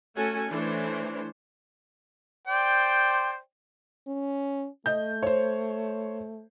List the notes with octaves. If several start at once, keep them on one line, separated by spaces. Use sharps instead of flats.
A3 C#4 F#4 A4 G#5
E3 A3 D4 C5 C#5
C5 D5 G5
C#4
A3 D#5 G6
C5 C#5